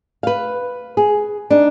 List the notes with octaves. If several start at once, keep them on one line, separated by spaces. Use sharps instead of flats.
B4 F5
G#4
D4 D#4